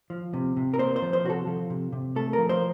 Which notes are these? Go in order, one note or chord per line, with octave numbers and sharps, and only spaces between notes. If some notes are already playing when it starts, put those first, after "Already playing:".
F3
C3
C3
A#4
A#3 C5
C5
F3
C5
C3 F#4
A4
F3
C3
C3
A3 A4
A#4
F3
C5